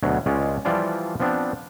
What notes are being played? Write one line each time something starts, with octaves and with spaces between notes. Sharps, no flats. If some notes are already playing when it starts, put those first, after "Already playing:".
D2 B2 F#3
C#2 G#3 C#4 F4 D5
E3 F3 G3 F4 D5 A5
F3 B3 C4 D4